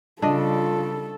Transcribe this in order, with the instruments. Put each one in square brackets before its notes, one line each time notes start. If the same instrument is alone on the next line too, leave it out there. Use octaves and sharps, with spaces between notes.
[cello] C#3 G3 [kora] D4 D#5 [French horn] F4 [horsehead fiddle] A4